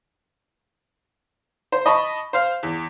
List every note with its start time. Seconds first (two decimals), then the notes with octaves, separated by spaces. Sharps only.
1.72 C5
1.86 D#5 A5 B5 C#6
2.33 C5 F5
2.63 E2